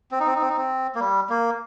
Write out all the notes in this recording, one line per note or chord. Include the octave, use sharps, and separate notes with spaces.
C4
D#4
C4
D#4
C4
D#4
C4
A#3
G3
A#3